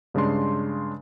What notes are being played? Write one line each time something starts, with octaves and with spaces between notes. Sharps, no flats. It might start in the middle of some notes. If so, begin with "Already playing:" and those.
G2 C#3 G#3 D4 C6